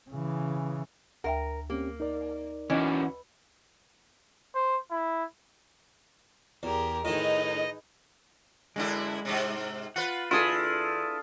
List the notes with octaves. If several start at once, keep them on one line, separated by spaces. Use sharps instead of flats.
C#3 E3
D2 A#4 E5 G5
A#3 C4 C#4 G4
D#4 A#4 D5
E3 C#4 D4 F#4 D#5
C5
E4
E2 G4 G#4 A#4
A2 D#3 D#4 G#4 B4 D#5
F#2 D3 G#3 E4
G#2 C3
F4 B4 F#5
D3 E4 F4 G#4 A4 B4